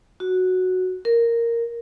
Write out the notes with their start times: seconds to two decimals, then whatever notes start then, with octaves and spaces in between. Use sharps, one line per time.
0.20 F#4
1.05 A#4